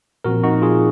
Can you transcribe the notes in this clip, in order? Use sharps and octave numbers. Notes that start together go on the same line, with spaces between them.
A#2 F3 C4 F#4 A#4
D#4 F#4
F4 G#4